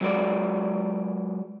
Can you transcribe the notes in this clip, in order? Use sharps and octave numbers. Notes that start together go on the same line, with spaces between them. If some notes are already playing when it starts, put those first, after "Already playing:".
F#3 G#3 F#4 A#4 D5